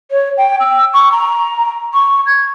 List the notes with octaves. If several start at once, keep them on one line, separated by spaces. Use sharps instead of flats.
C#5
G5
E6
C#6
A#5
C#6
G#6